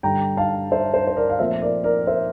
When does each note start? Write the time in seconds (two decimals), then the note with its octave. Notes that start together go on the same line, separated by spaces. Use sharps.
0.03 G2 D3 G3 D4 G5 A#5
0.37 F5 A5
0.71 C5 E5
0.94 C5
1.07 C5
1.17 A#4 D5
1.30 F5
1.39 A#2 F3 A3 C4 C5 E5
1.62 A#4 D5
1.84 A#4 D5
2.07 C5 E5